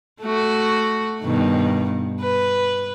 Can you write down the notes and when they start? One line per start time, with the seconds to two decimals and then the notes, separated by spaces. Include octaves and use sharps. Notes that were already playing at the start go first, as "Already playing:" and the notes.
0.21 A3 F#4
1.23 G2 B2 D#3
2.22 B4